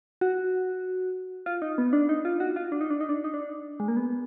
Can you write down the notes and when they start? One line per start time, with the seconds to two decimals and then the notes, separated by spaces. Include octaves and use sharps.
0.21 F#4
1.46 F4
1.62 D#4
1.78 B3
1.93 D4
2.09 D#4
2.25 F4
2.40 F#4
2.56 F4
2.72 D4
2.81 D#4
2.90 D4
3.00 D#4
3.09 D4
3.24 D#4
3.34 D4
3.80 G#3
3.88 A#3
3.97 B3